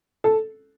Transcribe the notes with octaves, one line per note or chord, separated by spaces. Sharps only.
A4